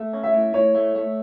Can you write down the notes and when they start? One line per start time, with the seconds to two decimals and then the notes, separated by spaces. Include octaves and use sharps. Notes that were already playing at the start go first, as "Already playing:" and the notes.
Already playing: A3
0.13 C#4
0.23 E5
0.34 A2
0.54 A2 C#5
0.75 A3
0.95 A3